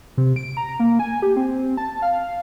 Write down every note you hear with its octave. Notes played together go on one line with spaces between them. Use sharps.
C3
D7
A#5
A#3
G#5
G4
C4
A5
F5